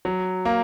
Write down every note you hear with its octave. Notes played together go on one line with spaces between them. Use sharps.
F#3
A#3